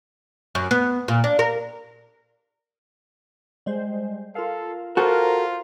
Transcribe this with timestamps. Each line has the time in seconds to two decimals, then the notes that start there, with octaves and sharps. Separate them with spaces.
0.55 F#2
0.71 B3
1.08 A#2
1.24 D4
1.39 A#4
3.66 G3 G#3 C5
4.35 F4 A4 A#4 F5
4.97 F4 F#4 A4 A#4 C5